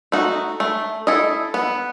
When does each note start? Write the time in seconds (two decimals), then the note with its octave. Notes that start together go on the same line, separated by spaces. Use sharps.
0.12 A3 D#4 F#4
0.60 A3
1.07 E4 A4 D#5
1.54 B3